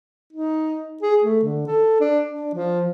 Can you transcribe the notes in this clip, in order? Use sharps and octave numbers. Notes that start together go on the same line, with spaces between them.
D#4
G#4
A3
D3
A4
D4
D4
F3